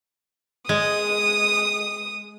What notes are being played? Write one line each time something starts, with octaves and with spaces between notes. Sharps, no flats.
G#3 D#6